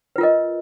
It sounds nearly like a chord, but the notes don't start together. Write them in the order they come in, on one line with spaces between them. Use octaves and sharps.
B4 F4 A#4 D#5